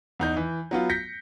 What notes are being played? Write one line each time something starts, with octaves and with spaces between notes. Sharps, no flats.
E2 D#4 G6
E3
F#3 B3 F4
G6 A#6 B6 C#7